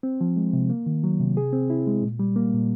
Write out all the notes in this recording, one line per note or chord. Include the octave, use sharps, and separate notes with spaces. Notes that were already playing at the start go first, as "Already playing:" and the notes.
C4
F3
G#3
C3
A#3
D#3
F#3
C3
G#4
C4
E4
G#3
A#2
G3
A#3
A#2